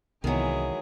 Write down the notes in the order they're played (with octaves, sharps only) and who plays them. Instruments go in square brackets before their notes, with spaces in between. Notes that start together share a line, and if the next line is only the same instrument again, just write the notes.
[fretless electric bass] C2 B3 [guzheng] D#3 F#3 [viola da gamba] E3 G#3 G#4